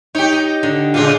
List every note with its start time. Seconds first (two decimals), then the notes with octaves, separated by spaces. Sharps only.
0.15 D#4 G4 C#5 G5
0.32 D#5
0.63 D3
0.94 A#2 C#3 G#3 D4 F4